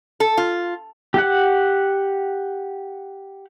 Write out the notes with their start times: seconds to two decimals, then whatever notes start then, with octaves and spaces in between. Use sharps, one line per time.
0.20 A4
0.37 F4
1.14 G4 F#5